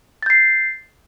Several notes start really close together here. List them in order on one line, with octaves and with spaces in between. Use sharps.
A6 G6 C7